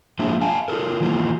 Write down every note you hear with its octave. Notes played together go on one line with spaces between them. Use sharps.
F3 G#3 A#3 D4 E4
F5 G#5 A5
F4 F#4 A4 A#4
D#3 E3 F#3 A#3 E4 F4